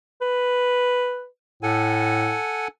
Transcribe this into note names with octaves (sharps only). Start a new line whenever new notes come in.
B4
A2 A4 F#5 G#5